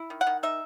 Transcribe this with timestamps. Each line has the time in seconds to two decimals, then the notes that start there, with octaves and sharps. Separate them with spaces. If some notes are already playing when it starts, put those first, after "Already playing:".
Already playing: E4
0.10 D#3
0.21 F#5
0.27 D#3
0.43 D#4 E5